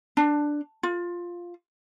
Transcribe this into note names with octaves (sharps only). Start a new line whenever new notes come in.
D4
F4